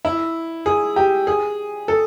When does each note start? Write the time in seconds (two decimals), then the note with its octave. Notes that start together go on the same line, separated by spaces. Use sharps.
0.05 E4
0.66 G#4
0.96 G4
1.27 G#4
1.88 A4